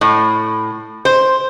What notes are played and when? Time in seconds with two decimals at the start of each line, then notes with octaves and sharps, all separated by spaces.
0.01 A2
1.05 C5